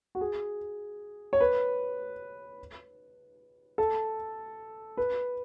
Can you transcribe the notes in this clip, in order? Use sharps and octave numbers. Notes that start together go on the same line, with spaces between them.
F#4
G#4
C#5
B4
A4
B4